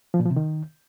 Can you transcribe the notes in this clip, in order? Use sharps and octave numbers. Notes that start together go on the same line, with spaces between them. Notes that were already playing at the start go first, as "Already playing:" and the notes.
F3
A#2
F3
C3
D#3